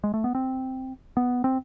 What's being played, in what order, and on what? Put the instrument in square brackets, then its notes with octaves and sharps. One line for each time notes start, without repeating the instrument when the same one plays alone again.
[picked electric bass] G#3
A3
B3
C4
B3
C4